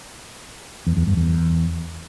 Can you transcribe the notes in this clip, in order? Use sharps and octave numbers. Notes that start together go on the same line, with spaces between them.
E2
E2
G2
E2